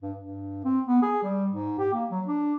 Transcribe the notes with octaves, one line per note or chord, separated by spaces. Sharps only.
G2
G2
C4
B3
G#4
G3
G#2
G4
A#3
F#3
D4